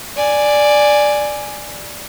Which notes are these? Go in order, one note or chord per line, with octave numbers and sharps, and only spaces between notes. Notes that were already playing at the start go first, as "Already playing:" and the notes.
D5 G#5